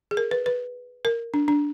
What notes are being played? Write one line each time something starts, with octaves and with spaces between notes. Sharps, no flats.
G#4
A#4
B4
B4
A#4
D4
D4